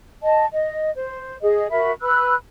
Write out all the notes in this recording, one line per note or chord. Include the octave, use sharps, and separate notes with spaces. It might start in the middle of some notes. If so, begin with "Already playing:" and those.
D#5 A5
D#5
C5
G#4 D#5
F#4 A#4 E5 B5
B4 B5 E6 F#6